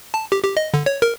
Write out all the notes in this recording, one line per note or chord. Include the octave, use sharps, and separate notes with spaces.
A5
G4
G4
D#5
D3
C#5
A#4